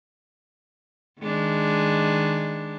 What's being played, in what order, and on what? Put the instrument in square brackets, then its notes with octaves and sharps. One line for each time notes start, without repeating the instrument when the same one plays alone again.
[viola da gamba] D#3 G#3 D4